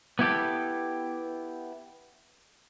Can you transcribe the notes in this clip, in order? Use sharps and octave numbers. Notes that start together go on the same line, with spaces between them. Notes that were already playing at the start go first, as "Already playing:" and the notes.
B3 E4 G4 A4